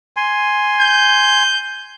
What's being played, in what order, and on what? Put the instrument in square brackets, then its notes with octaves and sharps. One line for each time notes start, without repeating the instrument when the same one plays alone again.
[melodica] G#5 C6
[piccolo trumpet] G6